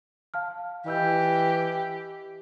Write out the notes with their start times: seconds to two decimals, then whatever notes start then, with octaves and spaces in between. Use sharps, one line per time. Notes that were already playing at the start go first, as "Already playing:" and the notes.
0.34 F5 A5 F6
0.86 E3 G4 D#5 E6 G6